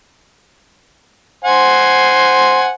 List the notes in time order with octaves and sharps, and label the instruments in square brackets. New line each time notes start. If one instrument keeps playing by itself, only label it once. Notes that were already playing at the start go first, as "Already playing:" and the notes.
[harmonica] C5 F#5 G#5